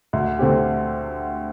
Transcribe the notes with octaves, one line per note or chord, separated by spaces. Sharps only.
D2
D3 A3 C4 G4